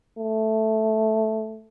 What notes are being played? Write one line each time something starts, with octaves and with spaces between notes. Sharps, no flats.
A3